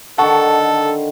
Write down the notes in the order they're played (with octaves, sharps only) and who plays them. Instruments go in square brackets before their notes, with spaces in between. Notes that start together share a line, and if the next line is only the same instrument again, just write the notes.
[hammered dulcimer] D3 D#3 [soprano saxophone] A4 [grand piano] F#5 A5 C#6